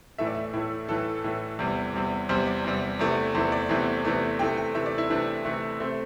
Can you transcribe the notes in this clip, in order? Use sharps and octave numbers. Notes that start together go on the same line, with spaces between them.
A2 E3 A3 E5
D5
E5
A2 E3 A3 E4
A2 E3 A3 A4
A2 E3 A3
E2 C3 G3
E2 C3 G3
E2 C3 G3 C5
D5
E2 C3 G3
E2 C3 E3 A3
E2 C3 E3 A3 C5
D5
E2 C3 E3 A3
E2 C3 E3 A3
C3 E3 A3 G5
G5
C3 E3 A3 E5
D5
E4
C3 E3 A3 D4
C3 E3 A3
C3 A3 C4